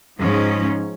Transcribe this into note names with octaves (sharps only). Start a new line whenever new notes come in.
G#2 F3 C#4